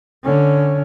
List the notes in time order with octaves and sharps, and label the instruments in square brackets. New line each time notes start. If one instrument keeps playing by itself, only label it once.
[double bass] D3 C#4